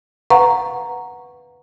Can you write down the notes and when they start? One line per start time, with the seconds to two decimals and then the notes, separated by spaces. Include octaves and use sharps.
0.30 B4 F5 F#5 A#5 C#6